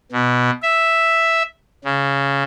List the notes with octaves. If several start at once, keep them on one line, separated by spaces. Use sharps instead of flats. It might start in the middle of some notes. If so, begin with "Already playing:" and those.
B2
E5
C#3